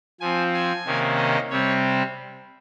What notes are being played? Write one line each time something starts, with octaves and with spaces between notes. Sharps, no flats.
F3 C4 G#5
G#5
C3 D#3 A#3 C#4
D#5
C3 G3 C4 C#5